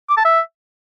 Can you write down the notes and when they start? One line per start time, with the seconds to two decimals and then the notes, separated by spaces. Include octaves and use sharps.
0.09 D6
0.17 A5
0.25 E5